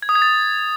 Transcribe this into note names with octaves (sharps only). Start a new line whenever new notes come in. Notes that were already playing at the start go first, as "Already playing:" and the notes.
G#6
D#6
G#6
A6